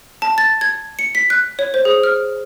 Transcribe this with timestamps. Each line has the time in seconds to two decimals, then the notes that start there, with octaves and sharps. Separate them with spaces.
0.22 A5
0.38 A6
0.61 G#6
0.99 C#7
1.15 B6
1.30 F#6
1.59 C#5
1.74 C5
1.85 G#4
2.03 F6